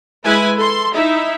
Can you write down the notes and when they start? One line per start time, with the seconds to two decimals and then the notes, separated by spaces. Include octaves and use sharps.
0.24 G#3 E4 B4 G#5
0.56 A4 C6
0.94 D#4 E4 E5